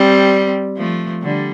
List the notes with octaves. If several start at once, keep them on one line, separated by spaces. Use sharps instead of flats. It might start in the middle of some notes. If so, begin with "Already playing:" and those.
Already playing: G3 C4
F3 A3
D3 G3